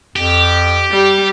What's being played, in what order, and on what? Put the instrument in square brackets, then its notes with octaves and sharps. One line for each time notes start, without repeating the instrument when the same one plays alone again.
[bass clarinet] F2 [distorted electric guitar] G4
[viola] G3